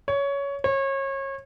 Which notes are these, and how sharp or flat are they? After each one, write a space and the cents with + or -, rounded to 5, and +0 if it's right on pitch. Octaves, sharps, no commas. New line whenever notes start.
C#5 +15
C#5 -30